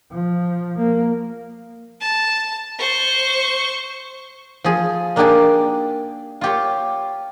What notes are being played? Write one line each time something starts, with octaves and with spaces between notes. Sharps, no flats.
F3
A#3
A5
C5 C#6
F3 G#4
A#3 D4 D#4 G4 G#4 D5
F4 G4 C#5